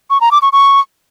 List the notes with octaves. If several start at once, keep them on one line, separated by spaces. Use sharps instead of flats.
C#6
A#5
D6
C#6
C#6